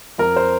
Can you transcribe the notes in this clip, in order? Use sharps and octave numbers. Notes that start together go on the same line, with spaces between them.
F2 A#4
C5